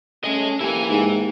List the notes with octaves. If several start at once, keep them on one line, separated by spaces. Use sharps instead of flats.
A3 C#4 D#5 G#5
A#3 E4 G4 G#5
G#2